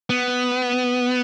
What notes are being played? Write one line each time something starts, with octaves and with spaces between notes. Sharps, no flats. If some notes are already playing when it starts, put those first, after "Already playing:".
B3